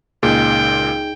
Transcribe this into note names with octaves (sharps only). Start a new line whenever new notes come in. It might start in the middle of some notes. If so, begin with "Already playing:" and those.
C#2 A#2 D#4 G#4 G5